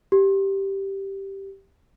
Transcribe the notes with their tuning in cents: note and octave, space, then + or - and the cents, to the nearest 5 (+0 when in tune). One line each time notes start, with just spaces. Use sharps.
G4 -5